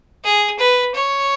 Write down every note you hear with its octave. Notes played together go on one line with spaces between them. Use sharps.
G#4
B4
C#5